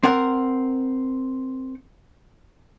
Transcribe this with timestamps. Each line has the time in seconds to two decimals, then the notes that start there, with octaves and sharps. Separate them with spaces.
0.03 C4 A#4 F#5